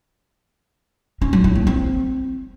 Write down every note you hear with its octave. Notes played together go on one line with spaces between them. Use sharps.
C#4
F#3
E4
A#3
C4